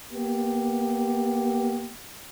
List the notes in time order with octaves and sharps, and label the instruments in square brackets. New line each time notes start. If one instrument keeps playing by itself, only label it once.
[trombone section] A#3 B3 G4